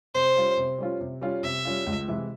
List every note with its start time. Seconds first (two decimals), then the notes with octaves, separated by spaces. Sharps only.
0.14 C3 C5
0.36 G3 C#4 F4
0.57 C3
0.78 G3 C#4 F4
1.01 C3
1.21 G3 C#4 F4
1.43 C3 E5
1.65 G3 C#4 F4
1.86 C#2
2.08 C3 E3 G#3 E4